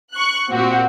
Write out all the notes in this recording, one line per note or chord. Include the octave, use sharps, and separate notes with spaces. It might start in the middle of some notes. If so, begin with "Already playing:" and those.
C#6 F#6
A#2 C4 F#4 G4